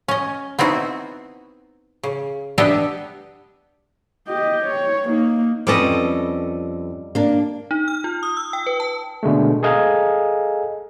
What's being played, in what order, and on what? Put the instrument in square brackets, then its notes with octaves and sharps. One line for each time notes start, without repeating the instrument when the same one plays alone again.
[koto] C#4 D#5
B3 C4 D#4 E4 F#4
C#3
B3 D4 G4 A4 D#5 E5
[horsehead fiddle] G4 D#5
C#5
A#3 D#4
[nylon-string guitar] F2 C#4 B4 [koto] G3 A4 D#5
[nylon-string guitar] A#3 D4
[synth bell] D#4
F6
F4
D#6
E6
G5
B4
A5
[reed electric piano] B2 D3 G#3 A3
G#4 A4 D#5 F5 G#5 A#5